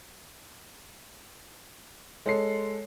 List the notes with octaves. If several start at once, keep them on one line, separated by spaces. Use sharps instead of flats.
G#3 A4 C#5 C7